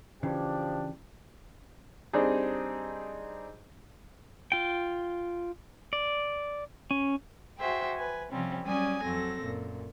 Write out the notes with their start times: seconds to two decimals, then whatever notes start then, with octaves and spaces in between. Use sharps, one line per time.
0.23 C#3 E3 F3 D4 G4
2.13 G3 C4 D4 D#4 G#4
4.52 F4 G5
5.93 D5
6.91 C#4
7.58 F#4 G#4 C5 E5 G5
7.97 B4 G#5
8.32 C3 F3 G3 C4 C#4
8.65 F#3 G3 C#4 D5 G#5 D#6
9.02 F2 F#3 C4 A4 A#6
9.43 F#2 A#2